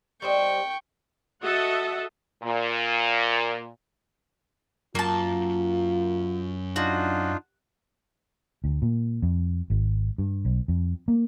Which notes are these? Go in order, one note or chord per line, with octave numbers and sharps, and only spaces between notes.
G3 C5 D#5 G5 C#6
F#4 A4 D#5 E5 F#5
A#2
F#2 A#3 F4 A5
D4 D#4 F4 F#4
D2
A#2
F2
G#1
G2
B1
F2
A#3